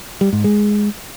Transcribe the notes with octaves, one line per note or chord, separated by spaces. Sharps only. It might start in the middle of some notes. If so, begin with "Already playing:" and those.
G3
G#2
G#3